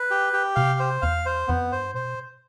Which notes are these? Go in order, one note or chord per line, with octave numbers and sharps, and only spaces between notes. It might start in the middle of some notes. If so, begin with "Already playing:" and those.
Already playing: B4
G4
G4
C3 F5
C5
E2 F5
C5
F2 B3
G2 C5
B2 C5